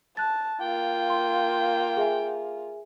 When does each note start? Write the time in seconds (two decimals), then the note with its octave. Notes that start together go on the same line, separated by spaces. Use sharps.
0.17 A5 F#6 A6
0.61 A#3 F4 G5
1.10 C6
1.97 G#4 E5 G#5